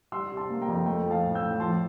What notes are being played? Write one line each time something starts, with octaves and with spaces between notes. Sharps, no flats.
G3 C6 E6
C3
A5 C6
A#3
G5 A#5
F2
A3 G5
F3
F5 A5
A2
E6 G6
A2
F3 A5 C6